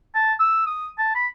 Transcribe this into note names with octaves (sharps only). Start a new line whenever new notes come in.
A5
E6
D#6
A5
B5